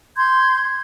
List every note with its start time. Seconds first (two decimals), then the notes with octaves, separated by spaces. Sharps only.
0.16 C6 G6 G#6